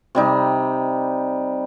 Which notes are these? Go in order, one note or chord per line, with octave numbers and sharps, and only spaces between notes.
C3 G3 D#4